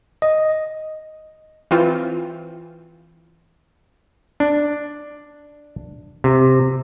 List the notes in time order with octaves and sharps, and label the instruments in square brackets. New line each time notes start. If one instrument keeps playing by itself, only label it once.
[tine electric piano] D#5
[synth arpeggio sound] E3 C4 F4
[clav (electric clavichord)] D4
C3